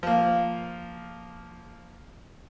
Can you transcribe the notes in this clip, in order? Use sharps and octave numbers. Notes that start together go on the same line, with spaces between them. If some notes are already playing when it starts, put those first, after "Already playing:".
F3 A#3